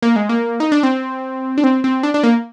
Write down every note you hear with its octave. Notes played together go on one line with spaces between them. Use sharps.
A#3
G#3
A#3
D#4
D4
C4
D4
C4
C4
D4
D4
A#3